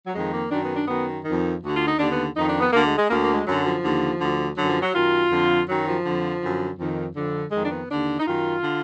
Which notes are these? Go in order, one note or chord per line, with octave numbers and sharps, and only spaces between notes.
F#3
F2 D#3 G#3
A#3
F#2 D#3 D4
B3
D4
F#2 D#3 B3
F2 D#3
D2 D3 F#4
F4
D#4
D#2 D3 D4
B3
F2 D#3 D#4
D4
B3
D2 D3 A#3
G#3
G#3
D2 D3 A#3
A#3
G#3
F#2 D3 F#3
F3
D#2 D3
D2 D3
F#2 D3 F#3
F3
F#3
F#2 D#3 F4
F2 D3
F#2 D#3 F#3
F3
F2 D3
F#2 D3
F2 D#3
F2 D3
F2 D#3 G#3
D4
B3
D#2 D3 D4
D#4
F#2 D#3 F4
D3